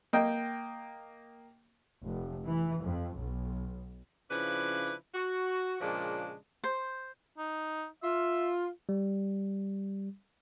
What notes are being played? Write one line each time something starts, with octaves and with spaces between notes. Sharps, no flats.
A#3 D#5 G5
F1
E3
F2
B1
C#3 F3 D4 E4 B4
F#4
A#2 C#3 F3 G#3 D4
C5
D#4
F4 E5
G3